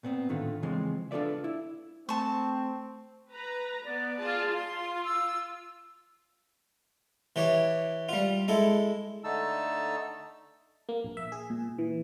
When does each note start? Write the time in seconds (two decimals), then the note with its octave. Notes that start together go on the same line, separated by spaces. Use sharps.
0.03 A#2 B3 C4
0.29 A2 D3 D#3 A3 F4
0.63 C#3 E3 F3 G#3 C4
1.11 D4 F4 A4 B4 D5 E5
1.44 E4
2.09 A3 C4 A5 C#6
3.32 B4 A#5
3.84 B3 D5
4.19 F4 G#4 A5
4.52 F4 C6
5.05 E6
7.36 E3 G4 C#5
8.09 G3 F4
8.48 G#3 E4 A4
9.24 D3 A3 D#4 A5 E6
10.89 A#3
11.04 A#1
11.17 E5
11.32 G#4
11.50 A#2
11.79 E3